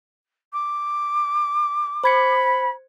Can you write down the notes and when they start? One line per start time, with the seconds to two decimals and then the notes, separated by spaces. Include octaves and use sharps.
0.53 D6
2.04 C5 B5 G#6 C#7